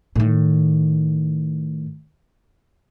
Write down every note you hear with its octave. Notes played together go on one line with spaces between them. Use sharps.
A2 D#3